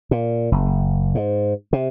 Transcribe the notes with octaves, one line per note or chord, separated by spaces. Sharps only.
A#2
F#1
G#2
C3